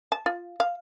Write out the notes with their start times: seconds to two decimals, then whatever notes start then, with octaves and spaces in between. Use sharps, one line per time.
0.12 A5
0.26 F4
0.60 F5